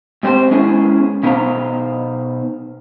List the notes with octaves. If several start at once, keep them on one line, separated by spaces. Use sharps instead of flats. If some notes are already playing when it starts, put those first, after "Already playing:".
G#2 G3 C4 G4 C5
G#3 B3 C#4 E4 G#4
B2 B3 D#4 C5 F5 A#5